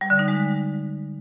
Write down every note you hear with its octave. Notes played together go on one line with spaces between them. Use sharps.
G3
D3
D#4
G#3